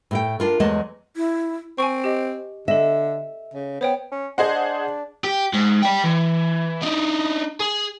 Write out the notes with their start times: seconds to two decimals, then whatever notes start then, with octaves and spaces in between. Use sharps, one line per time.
0.11 A2 A4 G5
0.40 D4 F4 A#4
0.60 E2 F#3 G#3 A3 D#5 A5
1.16 E4
1.78 C4 G#5 C#6
2.04 G4 D#5
2.68 D3 A4 D#5 E5
3.54 C#3
3.81 B3 C5 C#5 G5
4.12 C#4
4.38 D4 G#4 C5 D#5 F#5
5.24 G4
5.53 G#2
5.82 D5 G5
6.04 E3
6.82 D4 D#4
7.60 G#4